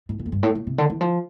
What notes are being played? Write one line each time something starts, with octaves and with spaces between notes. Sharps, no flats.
A2
A#2
F2
G2
A2
A#2
C3
D3
E3
F3